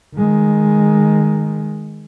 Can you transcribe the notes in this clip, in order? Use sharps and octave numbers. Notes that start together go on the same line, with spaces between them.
D#3 G#3